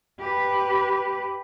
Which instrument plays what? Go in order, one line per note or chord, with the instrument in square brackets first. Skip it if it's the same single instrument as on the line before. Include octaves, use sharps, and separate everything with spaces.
[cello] G4 B4